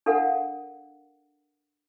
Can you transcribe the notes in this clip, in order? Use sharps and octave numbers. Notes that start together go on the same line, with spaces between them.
D4 A4 A#4 F5 F#5